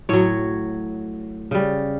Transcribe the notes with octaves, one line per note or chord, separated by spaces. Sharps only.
A2 F#3 C#5
C#3 G3